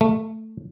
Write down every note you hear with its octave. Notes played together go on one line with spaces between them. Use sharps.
A3